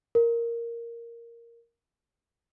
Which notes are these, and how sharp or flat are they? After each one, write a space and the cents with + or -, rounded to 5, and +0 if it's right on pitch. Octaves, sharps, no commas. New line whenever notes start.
A#4 +0